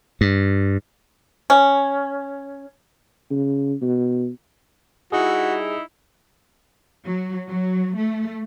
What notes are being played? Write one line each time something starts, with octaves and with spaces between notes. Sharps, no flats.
G2
C#4
C#3
B2
G3 D#4 E4 F#4 G#4
F#3
F#3
A3